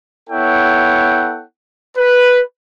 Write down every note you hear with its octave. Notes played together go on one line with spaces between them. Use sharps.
B3 E4 A4 C#5 F#5 G5
B4